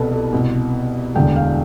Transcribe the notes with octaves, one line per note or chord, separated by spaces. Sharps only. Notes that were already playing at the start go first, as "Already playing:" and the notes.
Already playing: C2 B2 A4 B4
A4
C2 B2
E1 D2 D3 G5
F5